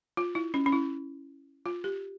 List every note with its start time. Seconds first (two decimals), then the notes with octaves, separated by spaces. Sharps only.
0.17 F4
0.35 E4
0.54 C#4
0.66 C#4
0.72 E4
1.66 F4
1.84 G4